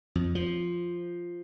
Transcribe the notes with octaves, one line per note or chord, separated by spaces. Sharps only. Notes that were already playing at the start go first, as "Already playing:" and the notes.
F2
F3